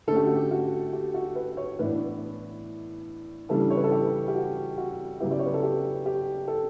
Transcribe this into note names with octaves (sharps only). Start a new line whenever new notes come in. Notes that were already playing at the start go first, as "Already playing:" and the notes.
D3 A3 C#4 A4
G4
F#4
G4
F#4
G4
F#4
B4
C#5
A2 E3 B3 D4 B4
C#3 E3 G3 D4 A4
C#5
B4
A4
G4
G4
F#4
F#4
C#3 F#3 B3 E4 G4
D5
C#5
B4
A4
G4
G4
A4